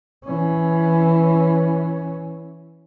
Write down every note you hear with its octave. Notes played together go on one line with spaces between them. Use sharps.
E3 C#4